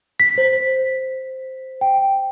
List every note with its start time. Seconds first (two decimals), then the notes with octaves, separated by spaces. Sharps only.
0.20 B6
0.38 C5
1.81 G5